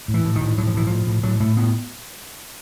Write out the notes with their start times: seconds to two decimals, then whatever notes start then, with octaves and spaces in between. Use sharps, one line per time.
0.08 A2
0.14 E3
0.25 A2
0.36 D#3
0.41 A2
0.57 A2 F#3
0.67 F3
0.74 A2 E3
0.87 A2 F3
1.07 A2
1.23 A2 F#3
1.40 A2 A3
1.56 A2 B3